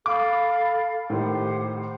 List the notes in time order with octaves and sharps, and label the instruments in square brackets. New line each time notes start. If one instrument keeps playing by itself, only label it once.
[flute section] A4 F5 B5 [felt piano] D6
[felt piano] A2 D#3 [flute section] G4 C5 F#5